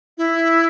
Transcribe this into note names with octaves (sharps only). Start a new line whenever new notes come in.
E4